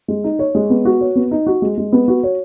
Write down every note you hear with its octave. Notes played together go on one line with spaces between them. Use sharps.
G#3
D#4
C#5
G#3
B3
F#4
C#5
B3
D#4
F#4
G#3
G#3
B3
F#4
C#5